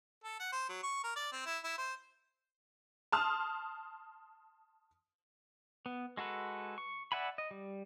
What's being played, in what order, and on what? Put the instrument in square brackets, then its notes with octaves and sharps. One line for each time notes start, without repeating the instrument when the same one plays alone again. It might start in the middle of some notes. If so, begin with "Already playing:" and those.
[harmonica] A4
F#5
C5
F#3
C#6
A#4
D5
C4
E4
E4
C5
[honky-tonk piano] A5 C6 D#6 F6
[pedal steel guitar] B3
G#3 F#4 A4 B4
C#6
D5 E5 F#5 G#5 B5
D#5
G3